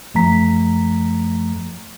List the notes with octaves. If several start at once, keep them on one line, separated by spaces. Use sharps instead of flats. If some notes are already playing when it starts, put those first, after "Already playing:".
F#2 F3 A3 A#5 B6